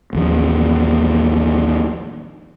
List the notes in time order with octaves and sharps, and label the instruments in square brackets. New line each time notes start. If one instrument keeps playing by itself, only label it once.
[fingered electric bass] A1 D#2 F3